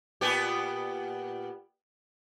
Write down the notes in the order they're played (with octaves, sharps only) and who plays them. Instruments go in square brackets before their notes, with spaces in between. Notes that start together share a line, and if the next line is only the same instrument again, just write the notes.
[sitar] A#2 B3 G4